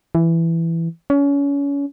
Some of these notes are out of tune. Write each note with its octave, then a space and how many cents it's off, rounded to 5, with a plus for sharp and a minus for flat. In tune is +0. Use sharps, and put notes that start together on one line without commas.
E3 +10
C#4 +30